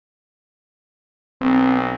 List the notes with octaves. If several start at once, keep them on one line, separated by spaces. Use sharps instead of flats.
B1 C4